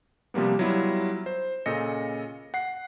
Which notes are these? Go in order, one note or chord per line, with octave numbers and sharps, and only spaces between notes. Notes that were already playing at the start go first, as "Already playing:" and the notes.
C3 F3 G3 A#3 B3
F#3 G3 B3 E4 F4
C5
A#2 C#3 A4 D#5 A#6 C#7
F#5 C7